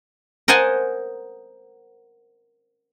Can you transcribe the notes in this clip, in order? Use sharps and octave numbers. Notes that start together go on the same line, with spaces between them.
A#4 C5 D#5 F#5 G#5 A5